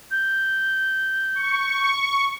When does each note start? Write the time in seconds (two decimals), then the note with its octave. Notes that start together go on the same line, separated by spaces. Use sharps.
0.11 G6
1.35 C#6